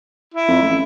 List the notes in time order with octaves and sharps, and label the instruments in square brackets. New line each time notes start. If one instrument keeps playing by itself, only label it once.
[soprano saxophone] E4
[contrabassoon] F2
A1